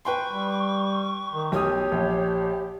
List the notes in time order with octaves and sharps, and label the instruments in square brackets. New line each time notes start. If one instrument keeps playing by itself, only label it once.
[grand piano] B4 G5 C6 [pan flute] C#6
[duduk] G3
D#3
[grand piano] B1 D#6 [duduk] G4 [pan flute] C#5
[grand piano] A#1